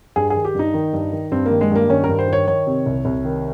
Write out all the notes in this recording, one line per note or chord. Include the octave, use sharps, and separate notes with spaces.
G2 G#4
G#4
D#3
G4
G2 D#4
D#3
G2
D#3
G2 C4
D#3 A#3
G#3
G2 A#3
D#3 C#4
A#4
G2
C5
D#3 C#5
D#3 C#5
C3
C2
C2
D#3